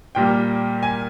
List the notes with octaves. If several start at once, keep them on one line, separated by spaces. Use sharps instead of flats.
A#2 G3 A#3 G5
G#5